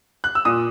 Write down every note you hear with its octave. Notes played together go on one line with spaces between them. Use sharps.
F#6
E6
A#2 D#6